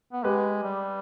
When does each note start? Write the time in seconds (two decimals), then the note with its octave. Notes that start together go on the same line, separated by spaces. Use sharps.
0.13 B3
0.24 G#3 G4 B4
0.63 G3